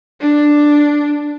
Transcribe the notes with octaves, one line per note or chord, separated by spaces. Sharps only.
D4